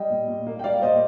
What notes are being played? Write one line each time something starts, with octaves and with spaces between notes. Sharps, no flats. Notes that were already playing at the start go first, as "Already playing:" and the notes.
Already playing: G3 D#5 G5
A#2
A#2
A#3
G5
G3 D5 F5
A#2 C5 D#5